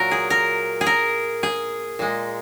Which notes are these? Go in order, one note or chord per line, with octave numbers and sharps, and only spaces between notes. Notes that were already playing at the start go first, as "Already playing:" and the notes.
Already playing: A#2 F#3 A#4
G#4
A#4
G#4
A#4
G#4
A#2 G#3